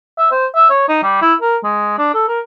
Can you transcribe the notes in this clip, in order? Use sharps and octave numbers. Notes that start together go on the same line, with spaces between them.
E5
C5
E5
C#5
D#4
G3
E4
A#4
G#3
D4
A4
A#4